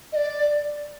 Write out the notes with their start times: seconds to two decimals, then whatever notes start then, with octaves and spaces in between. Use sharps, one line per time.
0.13 D#5
0.16 D5